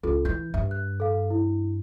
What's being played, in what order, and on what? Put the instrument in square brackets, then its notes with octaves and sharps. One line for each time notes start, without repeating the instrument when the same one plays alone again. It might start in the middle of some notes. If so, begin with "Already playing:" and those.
[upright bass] C#2 [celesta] F4 A4
[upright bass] E3 [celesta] G6
[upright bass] G2 [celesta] E5
[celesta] F#6
A4 F5
E4